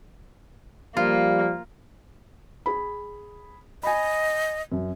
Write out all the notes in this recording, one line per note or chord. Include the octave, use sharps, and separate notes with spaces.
F3 G3 A#3 F4
G#4 B5
D#5 G#5 B5
F#2